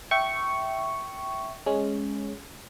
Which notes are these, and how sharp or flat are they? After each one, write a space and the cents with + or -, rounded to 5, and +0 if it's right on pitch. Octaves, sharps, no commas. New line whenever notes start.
E5 +0 G5 -20 C#6 +0
G#3 +5 C#4 +0